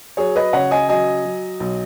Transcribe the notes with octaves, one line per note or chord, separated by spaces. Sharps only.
F#3 G#4 C#5
B4 D#5
C#3 C#5 F#5
D#5 G#5
F#3 D#5 G#5
F#3
B1